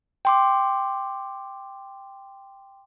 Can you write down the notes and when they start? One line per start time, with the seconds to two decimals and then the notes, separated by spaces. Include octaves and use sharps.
0.25 G5 C6 D6